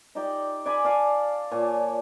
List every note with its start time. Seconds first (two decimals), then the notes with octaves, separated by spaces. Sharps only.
0.15 D#4 G4 D5 G5
0.66 D5 G#5 B5
0.84 D5 F5 A5
1.51 A#2 C#5 G#5 A5